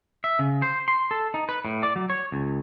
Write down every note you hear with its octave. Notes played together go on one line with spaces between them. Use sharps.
E5
C#3
C5
C6
A4
D#4
B4
A2
D5
F#3
C#5
C#2